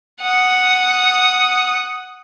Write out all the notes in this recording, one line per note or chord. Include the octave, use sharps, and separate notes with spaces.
F#5 D#6